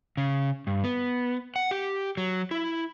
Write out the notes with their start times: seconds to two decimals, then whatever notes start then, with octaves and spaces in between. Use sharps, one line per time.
0.17 C#3
0.67 G2
0.84 B3
1.56 F#5
1.71 G4
2.17 F#3
2.51 E4